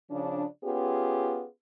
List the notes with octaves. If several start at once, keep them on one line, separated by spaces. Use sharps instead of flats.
C#3 F3 D4
B3 C#4 F4 G4 G#4